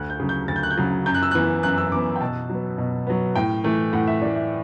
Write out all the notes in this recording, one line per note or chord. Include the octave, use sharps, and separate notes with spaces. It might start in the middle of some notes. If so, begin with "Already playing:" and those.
Already playing: D2 F#6
G6
C#3 F#3
G6
D2 A6
G6
F#6
G6
C#3 F#3
F#2 G6
F#6
E6
E3 B3 F#6
F#2 F#6
E6
E3 B3 D6
G5
B2 A5
F#3 B3
B2
F#3 B3
A2 G5
E3 A3
A2 F#5
E5
E3 A3 D5
E5